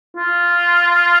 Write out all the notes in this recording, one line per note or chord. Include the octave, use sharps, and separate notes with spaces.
F4